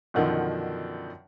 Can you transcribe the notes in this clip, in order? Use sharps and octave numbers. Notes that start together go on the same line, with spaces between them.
F#2 B2 D3 D#3 F3